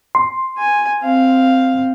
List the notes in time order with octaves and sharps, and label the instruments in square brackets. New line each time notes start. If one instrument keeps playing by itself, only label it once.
[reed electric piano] C6
[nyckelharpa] G#5
C4 F5